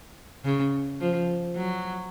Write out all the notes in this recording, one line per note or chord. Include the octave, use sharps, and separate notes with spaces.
C#3
F3
F#3